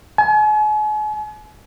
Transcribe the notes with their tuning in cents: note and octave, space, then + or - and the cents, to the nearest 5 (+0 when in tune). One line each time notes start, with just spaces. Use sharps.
G#5 +40